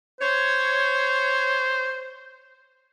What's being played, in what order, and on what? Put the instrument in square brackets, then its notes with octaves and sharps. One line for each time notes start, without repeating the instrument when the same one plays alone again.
[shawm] C5 [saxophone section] C#5